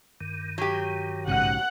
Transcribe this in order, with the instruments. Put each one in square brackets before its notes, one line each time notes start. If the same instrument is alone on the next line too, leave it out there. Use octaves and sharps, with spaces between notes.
[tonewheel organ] G2 D#3
[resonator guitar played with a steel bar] F#3 G4
[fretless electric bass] A#1 G#2 C#3 [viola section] F#5